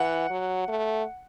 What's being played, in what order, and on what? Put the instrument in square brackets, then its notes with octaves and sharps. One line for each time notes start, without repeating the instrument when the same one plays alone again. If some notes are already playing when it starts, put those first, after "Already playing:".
Already playing: [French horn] E3 [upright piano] F#5
[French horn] F#3
A3